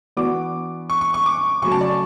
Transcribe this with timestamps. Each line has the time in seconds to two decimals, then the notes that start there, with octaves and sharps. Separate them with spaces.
0.17 E3 B3 D4 F#4 D6
0.90 C#6
1.01 C#6
1.14 C#6
1.26 D6
1.62 C#3 F#3 A3 C#6
1.72 A5
1.81 D5